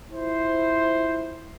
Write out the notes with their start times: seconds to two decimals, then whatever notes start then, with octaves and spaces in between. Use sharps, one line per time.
0.12 E4 F4 C5